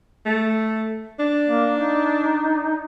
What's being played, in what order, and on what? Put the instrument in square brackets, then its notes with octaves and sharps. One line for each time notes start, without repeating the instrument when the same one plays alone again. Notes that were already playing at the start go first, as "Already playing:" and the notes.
[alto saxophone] A3
D4
[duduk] A#3
D#4